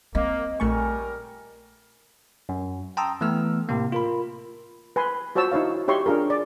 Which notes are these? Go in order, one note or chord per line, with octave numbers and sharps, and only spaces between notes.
A#3 C4 D#5
A#1 G3 A3 A#4 G#5 C#6
F#2
G5 A5 A#5 C6 D#6 E6
E3 A3 B3 E6 F6
A2 C3 A#3
F4 A#4 B5
B4 G#5 C6
F4 F#4 C5 C#5 A5 E6
D#4 E4 C#5 F5
D#4 G4 C#5 E5 C6 C#6
D4 F4 G#4 A#4
D5